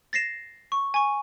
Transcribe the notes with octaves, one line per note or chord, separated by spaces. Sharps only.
A6 A#6 C7 E7
C#6
G#5 C#6